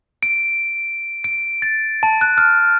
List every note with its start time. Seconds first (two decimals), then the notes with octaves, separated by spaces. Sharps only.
0.23 D7
1.24 D7
1.62 A6
2.03 A5
2.21 F#6
2.38 F6